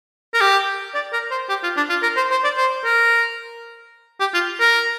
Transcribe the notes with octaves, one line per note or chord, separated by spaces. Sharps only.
A#4
G4
D5
A#4
C5
G4
F4
D4
F4
A#4
C5
C5
D5
C5
A#4
G4
F4
A#4